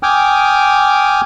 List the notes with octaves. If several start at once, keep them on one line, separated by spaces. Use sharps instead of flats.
G5 G#5 D6 D#6 F6